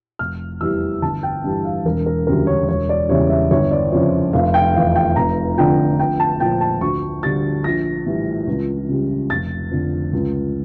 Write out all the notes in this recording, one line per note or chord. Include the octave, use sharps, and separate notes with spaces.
F1 F6
E2 E3 G3 E6
G1 A5
G5
G2 E3 G3
F5
E1 A#4
A#4
D2 C#3 G3 A#4
C#5
E1 C#5
D5
E2 C#3 E3 G3 C#5
E5
G1 C#5
D5
F2 C#3 F3 C#5
F1 F5
G5
E2 E3 F5
G5
F1 A#5
F2 D3 G5
A#1 G5
A5
A#2 F3 G5
A5
D2 C#6
D3 G3 A6
A#1 A#6
A2 E3 G3
C#2
C#3 G3
F1 A6
F2 D3
C#2